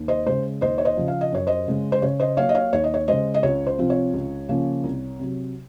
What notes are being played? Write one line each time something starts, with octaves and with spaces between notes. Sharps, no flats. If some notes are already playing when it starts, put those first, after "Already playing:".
Already playing: D#2
C5 D#5
C#3 G#3 C5
D#2 C5 D#5
C#5
C5 D#5
C#3 F3
F5
D#5
F#2 C#5
C5 D#5
C#3 G#3
C5
C#3 C#5
C5 D#5
F#3 A#3 C#5 F5
D#5
C#5 F5
D#2 C#5
D#5
C#5
C#3 G#3 C5 D#5
D#5
C#2 C#5
C5
C3 F3 C4 F4
C#5
C#2
C#3 F3 A#3 C#4
C2
C3 F#3